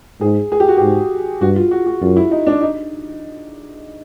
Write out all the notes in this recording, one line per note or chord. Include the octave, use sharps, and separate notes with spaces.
G#2 G#4
G#4
G4
F#4
G#2 G4
G2 F#4
F4
F#4
F#4
F#2 F4
E4
D#4
D4
D#4